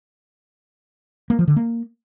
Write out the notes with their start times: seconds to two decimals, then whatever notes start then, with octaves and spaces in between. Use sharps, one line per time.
1.30 A#3
1.39 F3
1.48 D3
1.56 A#3